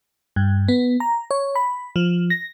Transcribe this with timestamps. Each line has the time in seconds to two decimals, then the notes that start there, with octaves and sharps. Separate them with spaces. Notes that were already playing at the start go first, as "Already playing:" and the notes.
0.36 G2
0.68 B3
1.00 A#5
1.31 C#5
1.55 B5
1.96 F3
2.30 A#6